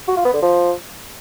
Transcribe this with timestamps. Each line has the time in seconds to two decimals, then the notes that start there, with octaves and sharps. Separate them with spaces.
0.08 F#4
0.17 F4
0.25 B3
0.33 D3
0.42 F3